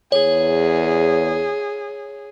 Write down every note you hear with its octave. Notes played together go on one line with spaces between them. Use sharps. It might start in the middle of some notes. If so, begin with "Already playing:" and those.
E2 G#4 C#5